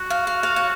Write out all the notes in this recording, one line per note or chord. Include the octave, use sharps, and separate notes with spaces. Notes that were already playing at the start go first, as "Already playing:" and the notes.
Already playing: F#4
F5
F5
F5
C#5